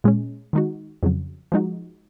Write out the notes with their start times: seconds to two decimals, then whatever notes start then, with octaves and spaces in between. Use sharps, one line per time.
0.04 A#2 G#3 C#4
0.53 D#3 G#3 D#4 F#4
1.03 F2 C#3 F#3
1.52 F3 G#3 D#4 F#4